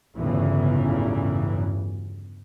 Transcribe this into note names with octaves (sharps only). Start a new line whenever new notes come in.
G1 E2 A2 C#3 E3 F#3